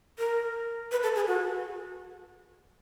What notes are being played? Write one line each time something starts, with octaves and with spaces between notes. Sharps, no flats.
A#4
B4
A4
G#4
F#4